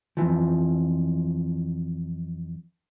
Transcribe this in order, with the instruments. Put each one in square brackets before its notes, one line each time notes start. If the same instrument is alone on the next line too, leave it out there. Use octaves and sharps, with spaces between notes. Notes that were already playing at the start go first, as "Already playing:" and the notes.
[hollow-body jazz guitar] F2 A2 E3 F3